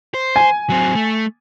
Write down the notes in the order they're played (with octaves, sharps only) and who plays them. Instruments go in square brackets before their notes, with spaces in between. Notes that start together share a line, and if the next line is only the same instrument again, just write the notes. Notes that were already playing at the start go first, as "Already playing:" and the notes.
[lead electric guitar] C5
[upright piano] G#5
[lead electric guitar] F#3 C4
A3